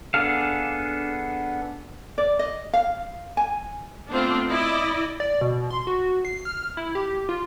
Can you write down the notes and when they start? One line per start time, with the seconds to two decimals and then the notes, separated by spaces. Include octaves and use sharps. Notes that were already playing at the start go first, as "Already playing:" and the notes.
0.14 B3 D4 G#4 A4 F5
2.18 D5
2.39 D#5
2.74 F5
3.37 G#5
4.10 A3 B3 C4 D4 F4
4.49 E4 D5 D#5
5.20 D5
5.41 B2
5.70 C6
5.87 F#4
6.25 C7
6.45 F6
6.77 E4
6.95 G4
7.29 F4